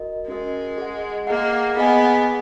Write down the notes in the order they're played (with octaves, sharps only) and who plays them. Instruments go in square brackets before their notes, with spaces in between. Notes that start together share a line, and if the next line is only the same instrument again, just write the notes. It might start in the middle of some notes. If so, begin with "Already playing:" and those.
Already playing: [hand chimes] F#4 A#4 D#5
[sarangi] G#3 [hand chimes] C#4 F#4 A#4 D#5
[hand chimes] G#4 D#5 F#5
[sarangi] A#3 [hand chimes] G#4 D#5 F#5
[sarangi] B3 [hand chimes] G#4 D#5 G#5